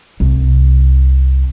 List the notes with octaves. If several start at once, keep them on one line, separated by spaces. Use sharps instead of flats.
C2